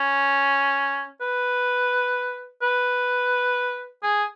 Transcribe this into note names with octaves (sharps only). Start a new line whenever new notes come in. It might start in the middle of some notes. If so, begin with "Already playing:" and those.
Already playing: C#4
B4
B4
G#4